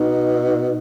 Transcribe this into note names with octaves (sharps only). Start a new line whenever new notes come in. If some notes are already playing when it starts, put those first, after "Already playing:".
Already playing: B2 D#4